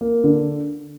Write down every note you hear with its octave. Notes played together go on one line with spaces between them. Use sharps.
A#3
D3